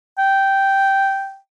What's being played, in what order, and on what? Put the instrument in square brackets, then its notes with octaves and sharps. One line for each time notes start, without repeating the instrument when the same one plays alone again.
[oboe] G5